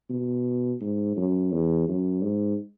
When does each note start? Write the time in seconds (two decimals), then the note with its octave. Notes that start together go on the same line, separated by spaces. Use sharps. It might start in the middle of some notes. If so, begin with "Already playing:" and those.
0.10 B2
0.81 G#2
1.17 F#2
1.52 E2
1.88 F#2
2.24 G#2